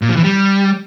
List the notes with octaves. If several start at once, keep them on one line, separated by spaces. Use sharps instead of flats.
A#2
F3
E3
G3